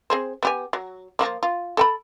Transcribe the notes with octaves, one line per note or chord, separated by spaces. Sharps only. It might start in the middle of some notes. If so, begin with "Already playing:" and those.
C4 G#4 C5
B3 G4 G#5
F#3
F3 A#3 D4
F4
A4 G5 B5